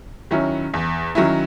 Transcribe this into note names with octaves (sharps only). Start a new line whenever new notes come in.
D#3 F#3 C#4 E4
E2
D#3 F#3 C#4 E4